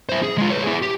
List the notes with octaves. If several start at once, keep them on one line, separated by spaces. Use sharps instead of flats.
E4 C5
G#4
G#3 F4
B4 C#5
E4 G#4
G4